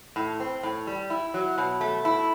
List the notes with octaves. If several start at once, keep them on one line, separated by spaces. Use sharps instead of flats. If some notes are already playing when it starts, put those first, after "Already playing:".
A2
C4
A2
G3
E4
F#3
B2
A3
E4